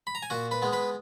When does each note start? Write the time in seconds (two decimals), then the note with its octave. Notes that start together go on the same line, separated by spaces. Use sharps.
0.07 B5
0.15 A#5
0.23 G#5
0.30 A#2 F#4 F#5
0.51 B4 B5
0.62 G#3 B3
0.73 B4 B5